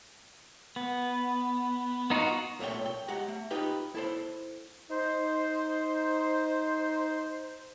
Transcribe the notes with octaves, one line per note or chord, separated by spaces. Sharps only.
B3
B3 D#4 F4 F#4
B1 A#2 A3 C#5 G5
G5
G#3 G4 F#5 A#5
A3
D#4 F4 G4 B4 G5
E4 A4 C5
D#4 C5